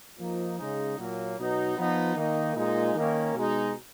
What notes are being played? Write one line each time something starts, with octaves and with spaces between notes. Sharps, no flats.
F3 A#3 D#4
C#3 G#3 D#4
A#2 F#3 A#3
B2 F#3 B3 D#4
F3 B3 D#4
D#3 A#3 D#4
A#2 G#3 D#4
D#3 A#3 C#4
B2 G#3 D#4